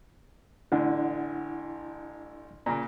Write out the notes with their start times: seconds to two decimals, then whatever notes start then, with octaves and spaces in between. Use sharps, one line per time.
0.72 A1 D3 D4 E4 F#5
2.66 A#2 C#3 A#5